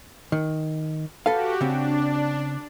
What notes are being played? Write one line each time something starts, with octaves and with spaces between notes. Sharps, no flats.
D#3
F#4 G4 A4 B4 F5
C#3 C4 D4